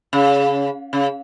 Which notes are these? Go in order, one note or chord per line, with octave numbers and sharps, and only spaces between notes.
C#3
C#3